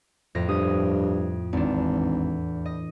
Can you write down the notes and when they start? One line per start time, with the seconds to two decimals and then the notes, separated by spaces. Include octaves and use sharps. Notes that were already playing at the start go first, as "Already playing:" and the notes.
0.35 F2 A2 A#6
0.49 G2 D#6
1.53 G#1 E2 D4
2.66 D#5